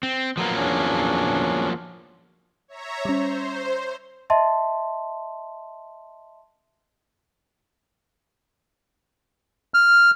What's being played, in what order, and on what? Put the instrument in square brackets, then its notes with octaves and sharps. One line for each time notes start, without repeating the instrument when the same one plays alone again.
[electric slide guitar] C4
[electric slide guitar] F3 F#3 A#3 [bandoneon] B3 A#4
[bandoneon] E2 C#4 D4
[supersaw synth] C#5 E5 A#5
[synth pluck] G3 C#4 [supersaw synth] C5
[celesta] D#5 E5 A5 C6
[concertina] F6